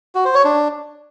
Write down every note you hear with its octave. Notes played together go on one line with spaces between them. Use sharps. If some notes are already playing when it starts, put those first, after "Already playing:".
F#4
C5
C#5
D4